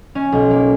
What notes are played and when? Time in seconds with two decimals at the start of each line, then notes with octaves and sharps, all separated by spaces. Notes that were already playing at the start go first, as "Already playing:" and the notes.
0.15 C#4
0.32 B1
0.51 A#3